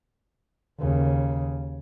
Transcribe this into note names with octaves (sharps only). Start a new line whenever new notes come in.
D#2 C#3